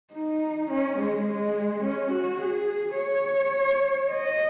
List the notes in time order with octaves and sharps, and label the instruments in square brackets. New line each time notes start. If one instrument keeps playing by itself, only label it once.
[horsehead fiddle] D#4
C#4
G#3
G#3
C#4
F#4
G#4
C#5
D#5